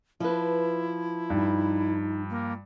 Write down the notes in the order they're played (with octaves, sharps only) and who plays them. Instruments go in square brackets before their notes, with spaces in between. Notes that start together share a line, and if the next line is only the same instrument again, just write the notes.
[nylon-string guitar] F3 B4 [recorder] E4
[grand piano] G2 [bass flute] D#4
[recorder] A#3